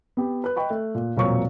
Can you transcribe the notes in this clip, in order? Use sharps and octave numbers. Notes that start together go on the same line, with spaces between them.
B3 G4
B4 F#6
D#5 G5 B5 C#6
A3
A#2
E1 A#2 F#3 C4 C#6